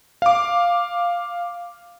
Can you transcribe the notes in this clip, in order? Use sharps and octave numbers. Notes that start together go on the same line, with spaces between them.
F5 D6